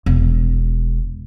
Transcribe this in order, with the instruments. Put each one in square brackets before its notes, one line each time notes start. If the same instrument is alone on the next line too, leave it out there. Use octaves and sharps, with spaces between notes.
[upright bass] E1